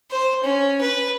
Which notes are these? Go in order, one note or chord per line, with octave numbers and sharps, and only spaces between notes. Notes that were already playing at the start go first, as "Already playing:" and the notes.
C5
C#4
B4